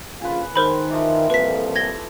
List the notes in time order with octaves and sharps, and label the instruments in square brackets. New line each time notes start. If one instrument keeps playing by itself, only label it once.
[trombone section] A#1 C#3 F4 [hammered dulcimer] B4 G#5
[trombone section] D#3 [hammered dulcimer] G#3 [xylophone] A#4 C5 B5
[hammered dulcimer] E3 F3
[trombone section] C2 F2 A#2 [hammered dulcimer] A4 [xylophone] B4 B6
[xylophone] G#6 A#6 G7